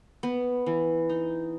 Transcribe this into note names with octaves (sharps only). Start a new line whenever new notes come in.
B3
E3
D#4